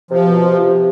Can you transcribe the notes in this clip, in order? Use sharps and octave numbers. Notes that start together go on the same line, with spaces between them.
C3 F3
B2
C3